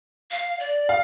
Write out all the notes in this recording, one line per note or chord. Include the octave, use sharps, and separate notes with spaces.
F5
D5
F5